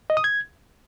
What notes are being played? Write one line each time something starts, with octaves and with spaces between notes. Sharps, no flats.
D#5
D#6
G#6